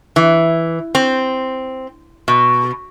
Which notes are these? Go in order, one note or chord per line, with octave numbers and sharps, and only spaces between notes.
E3
C4
B2